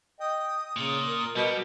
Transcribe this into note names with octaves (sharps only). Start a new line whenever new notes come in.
D#5 G5 D#6
A#2 C#3 D#6
A#4
B2 G3